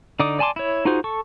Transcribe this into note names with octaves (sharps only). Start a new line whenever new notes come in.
D3 D#4 D5 D6 D#6
D5 G#5 A5 C6 D6
E4 C#5
D#4 F4 F#4 G#4 C5
A4 C#6